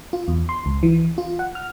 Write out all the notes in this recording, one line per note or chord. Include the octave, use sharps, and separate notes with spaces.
F4
E2
C6
C#2
E3
F4
F#5
F6